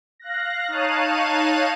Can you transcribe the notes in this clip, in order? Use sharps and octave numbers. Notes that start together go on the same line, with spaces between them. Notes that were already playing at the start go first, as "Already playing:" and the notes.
F5 F#6 A#6
D#4 C#5 F5 A5 F#6 D#7